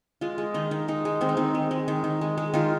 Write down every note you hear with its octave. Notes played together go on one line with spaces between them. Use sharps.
G#3 F4
G#3
D#3 D#4
D#3
G#3 D#4
G#3
D#3 C4
D#4
D#3 C4
G#3
G#3
D#3
D#3
G#3
G#3
D#3 F4